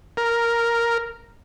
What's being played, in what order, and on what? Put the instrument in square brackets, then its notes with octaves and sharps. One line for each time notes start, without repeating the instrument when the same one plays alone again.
[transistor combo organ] A#4